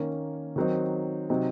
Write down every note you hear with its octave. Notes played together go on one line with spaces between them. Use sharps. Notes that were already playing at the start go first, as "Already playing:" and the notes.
Already playing: D#3 A#3 C#4
D#3 F#3 C4 D#4
C3 F#3 C4 D#4